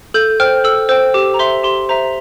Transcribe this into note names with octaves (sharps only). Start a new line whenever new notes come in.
A4 G6
C5 G5 F6
A4 E6
C5 G5 E6
G4 D6
A#5
C5 E5 C6
G4 C6
C5 E5 A#5